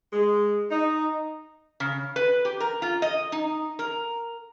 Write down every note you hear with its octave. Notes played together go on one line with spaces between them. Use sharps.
G#3
D#4
C#3
B4
G4
A#4
F4
D#5
D#4
A#4